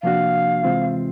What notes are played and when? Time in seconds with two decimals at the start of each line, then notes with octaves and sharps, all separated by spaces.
0.03 C3 F3 A#3 D4 F#4 F5
0.63 C3 E3 G#3 C4 F4